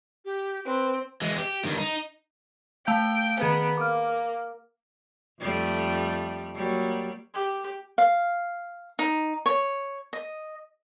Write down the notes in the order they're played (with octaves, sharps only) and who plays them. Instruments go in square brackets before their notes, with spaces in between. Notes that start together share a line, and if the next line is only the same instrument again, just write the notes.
[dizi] G4
[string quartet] C4 [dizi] B4
[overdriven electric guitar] E3 G#3
G4
G2 D#3
D#4
[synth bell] A3 F5 G6 [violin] G5
[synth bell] D#3 G#4 D7 [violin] B3
[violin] A#3 [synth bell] D6 F6
[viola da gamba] F2 G3 A3
F#3 G3 A#3
[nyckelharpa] G4
[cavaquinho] F5
D#4
C#5
D#5